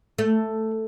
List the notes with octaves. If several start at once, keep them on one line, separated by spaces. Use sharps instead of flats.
A3